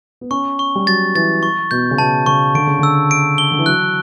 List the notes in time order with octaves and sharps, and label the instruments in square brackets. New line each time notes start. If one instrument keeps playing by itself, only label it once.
[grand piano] B3
[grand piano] C#4 [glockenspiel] C#6
[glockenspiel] C#6
[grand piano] G3
[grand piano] F#3 [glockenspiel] A6
[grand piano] E3 [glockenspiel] A6
[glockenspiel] C#6
[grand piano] B2 [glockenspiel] G6
[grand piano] C#3
[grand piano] B2 [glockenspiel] A5
[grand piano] C#3 [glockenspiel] C#6
[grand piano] D3 [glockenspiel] D7
[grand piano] C#3
[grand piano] D3 [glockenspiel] E6
[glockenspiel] D7
G7
[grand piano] D3
E3
[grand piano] F#3 [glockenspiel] F#6